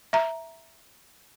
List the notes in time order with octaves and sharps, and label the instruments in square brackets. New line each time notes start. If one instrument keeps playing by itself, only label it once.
[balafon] E5 A#5